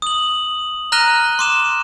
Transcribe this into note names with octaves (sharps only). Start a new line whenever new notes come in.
D#6 F#7
A#5 F6 F#6 A#6 D#7 G7
C6 D6 E7